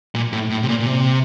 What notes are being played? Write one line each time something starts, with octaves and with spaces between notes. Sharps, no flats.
A#2
A2
A2
C3
A#2
A#2
C3